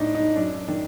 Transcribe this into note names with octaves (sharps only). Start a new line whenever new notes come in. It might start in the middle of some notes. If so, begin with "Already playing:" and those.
Already playing: A2 D4 D#4
D#4
F#2 D4
D#3 D4